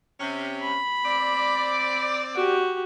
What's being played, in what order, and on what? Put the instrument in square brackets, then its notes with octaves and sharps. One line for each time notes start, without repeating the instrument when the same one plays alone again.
[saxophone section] C3 C#4
[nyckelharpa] B5
[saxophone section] C4 D5
[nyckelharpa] F#4 G4